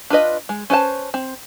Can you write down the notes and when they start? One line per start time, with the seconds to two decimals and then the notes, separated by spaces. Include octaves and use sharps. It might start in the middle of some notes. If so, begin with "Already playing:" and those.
0.10 D4 F4 B4 D#5
0.49 G#3
0.70 C#4 B4 C5 A5
1.14 C4